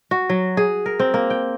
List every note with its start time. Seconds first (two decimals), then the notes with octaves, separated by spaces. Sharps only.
0.11 F#4
0.29 F#3
0.57 G#4
0.86 A#4
0.99 C4
1.14 A#3
1.30 G5